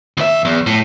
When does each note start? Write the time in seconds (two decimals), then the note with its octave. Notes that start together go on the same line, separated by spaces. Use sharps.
0.17 D#2 E5
0.45 E2
0.67 A2